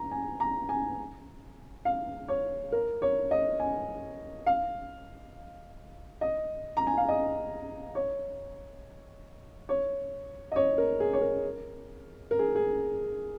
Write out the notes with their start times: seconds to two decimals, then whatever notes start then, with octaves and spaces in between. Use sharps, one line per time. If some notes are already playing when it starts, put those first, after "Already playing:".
Already playing: A#5
0.11 G#5
0.40 A#5
0.69 G#5
1.85 F5
2.28 C#5
2.72 A#4
3.02 C#5
3.31 D#5
3.60 G#5
4.46 F5
6.21 D#5
6.77 A#5
6.87 G#5
6.97 F5
7.09 D#5
7.95 C#5
9.69 C#5
10.52 D#5
10.56 C#5
10.78 A#4
11.00 G#4
11.13 C#5
11.21 A#4
12.31 A#4
12.39 G#4
12.55 G#4